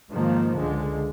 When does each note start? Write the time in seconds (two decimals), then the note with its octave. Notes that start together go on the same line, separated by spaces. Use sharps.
0.12 G#2 D#3 F3 A#3
0.58 C#2 D3 G#3